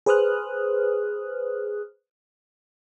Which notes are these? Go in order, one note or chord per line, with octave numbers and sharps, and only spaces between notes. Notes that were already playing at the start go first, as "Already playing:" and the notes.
G#4 B4 C5 D#6 F6 F#6